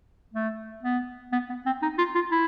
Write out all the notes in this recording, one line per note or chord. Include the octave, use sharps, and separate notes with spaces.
A3
B3
B3
B3
C4
D#4
F4
F4
E4